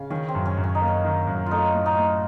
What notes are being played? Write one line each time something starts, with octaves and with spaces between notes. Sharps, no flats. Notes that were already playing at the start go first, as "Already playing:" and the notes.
Already playing: C#3 F5
D#3 C#4
C4
F#2
C#4
F#2
C#4
D#4
A#3
C#4
D#3
F#2
A3 D#4 F4
A2
D#4
A2